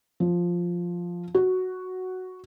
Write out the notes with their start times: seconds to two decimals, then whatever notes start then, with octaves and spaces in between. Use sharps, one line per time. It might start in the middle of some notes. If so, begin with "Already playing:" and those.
0.20 F3
1.35 F#4